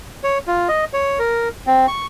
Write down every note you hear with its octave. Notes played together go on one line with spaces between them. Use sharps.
C#5
F4
D#5
C#5
A#4
C4
C#6